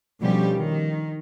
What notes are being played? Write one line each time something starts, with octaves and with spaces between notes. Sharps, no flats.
B2 D3 F3 G3 C#4 G4
D#3